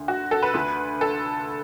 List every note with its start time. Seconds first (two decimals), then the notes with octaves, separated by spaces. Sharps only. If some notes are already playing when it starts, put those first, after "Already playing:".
Already playing: D2 D3
0.08 F#4
0.31 A4
0.43 B4
0.54 D2 D3
1.01 A4